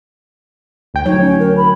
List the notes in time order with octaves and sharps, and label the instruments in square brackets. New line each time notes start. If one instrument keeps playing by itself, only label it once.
[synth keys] D2 G5
[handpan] F#3 C#5 [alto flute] D#4
[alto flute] C#4
A#4
B5